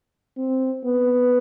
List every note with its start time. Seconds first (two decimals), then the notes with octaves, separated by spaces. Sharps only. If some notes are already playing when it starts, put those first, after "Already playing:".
0.37 C4
0.85 B3